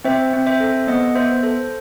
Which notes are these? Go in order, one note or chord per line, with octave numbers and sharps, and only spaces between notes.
C4 C5 E5
C4
C5 E5
A4
B3 D#5 F#5
B3 C5 E5
A4 C5